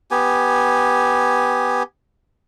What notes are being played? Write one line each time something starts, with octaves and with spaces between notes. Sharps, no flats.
B3 G4 G#5